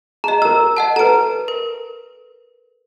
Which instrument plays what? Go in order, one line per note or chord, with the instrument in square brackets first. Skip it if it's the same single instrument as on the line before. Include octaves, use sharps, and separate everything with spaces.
[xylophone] G#4 D#5 [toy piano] A#5
[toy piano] A#4 E6 [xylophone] A#5
[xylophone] D#5 F#5 A5
[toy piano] A4 B4 [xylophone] A#5 D7
[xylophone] A#4